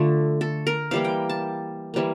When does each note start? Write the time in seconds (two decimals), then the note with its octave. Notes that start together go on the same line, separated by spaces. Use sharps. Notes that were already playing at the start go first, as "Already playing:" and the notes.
Already playing: D3 A3 F4
0.41 A4
0.67 A#4
0.91 E3 G3 A#3 F5
1.04 G5
1.29 A5
1.94 E3 G3 A#3